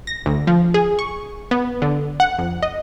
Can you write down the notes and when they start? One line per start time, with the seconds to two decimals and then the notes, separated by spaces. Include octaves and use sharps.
0.07 A#6
0.26 D2
0.47 F3
0.74 G#4
0.99 C#6
1.51 B3
1.82 D3
2.20 F#5
2.39 F2
2.63 D#5